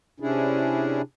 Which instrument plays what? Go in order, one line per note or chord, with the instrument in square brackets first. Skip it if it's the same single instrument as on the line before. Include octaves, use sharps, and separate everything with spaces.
[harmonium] C3 C#4 D4 E4 G#4